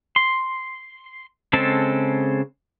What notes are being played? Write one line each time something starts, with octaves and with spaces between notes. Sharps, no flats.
C6
C#3 G#3 C4 A4 A5